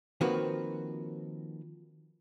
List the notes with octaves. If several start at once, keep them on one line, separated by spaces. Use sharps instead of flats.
D#3 F3 A#3 C4 F#4 B4